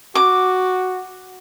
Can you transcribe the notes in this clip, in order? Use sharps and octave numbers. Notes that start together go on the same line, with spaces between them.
F#4 D6